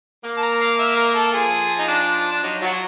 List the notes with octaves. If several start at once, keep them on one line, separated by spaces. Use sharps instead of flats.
A#3
A5
A#5
F5
E5
A#4
A4
F3 G#4
D#4
D4
D4
F#3 D#4
F#3 F4
F#4